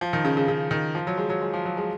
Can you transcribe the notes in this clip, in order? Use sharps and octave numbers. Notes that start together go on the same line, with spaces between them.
F3
D#3
C#3
C#3
C#3
D#3
F3
F#3
G#3
F#3
G#3
F3
F#3
G#3